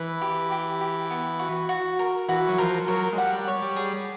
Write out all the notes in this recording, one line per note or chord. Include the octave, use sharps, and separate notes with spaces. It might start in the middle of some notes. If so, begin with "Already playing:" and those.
Already playing: E3 B4
G4
G4
G4
B3
F#4
F#4
A#4
E3 F#4
F#3
F3 A#4
F#3 A#4
G#3
G3 F#5
C#5
G3
G#4